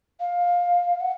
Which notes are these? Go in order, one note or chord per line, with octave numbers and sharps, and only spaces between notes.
F5
F#5